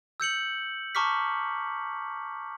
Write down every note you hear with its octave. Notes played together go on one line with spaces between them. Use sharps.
E6 G6 C#7 F#7
A5 A#5 C#6 D6 F6 B6